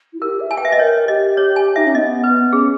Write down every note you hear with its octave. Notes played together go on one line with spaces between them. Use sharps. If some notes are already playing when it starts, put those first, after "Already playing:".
E4
G4 A#4
E5
G#5
G5
B4 E5
D#5
A#4 C#5
G4 D#5
C#5
G#5
D#4 E5
C#4
B3 D#5
B4
C#4 G#4